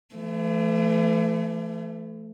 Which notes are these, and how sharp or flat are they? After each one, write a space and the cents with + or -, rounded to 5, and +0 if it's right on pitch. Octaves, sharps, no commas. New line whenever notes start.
E3 +45 A3 +0